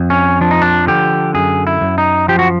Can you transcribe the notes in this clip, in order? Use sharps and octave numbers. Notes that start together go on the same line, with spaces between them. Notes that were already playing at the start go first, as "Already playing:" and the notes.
Already playing: F2
C#4
F3 D4
D#4
D4
D3 G4
F#2 G#4
E4
F#2
D#4
F3 G4
F#4